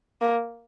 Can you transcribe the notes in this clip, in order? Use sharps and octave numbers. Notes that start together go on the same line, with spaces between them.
A#3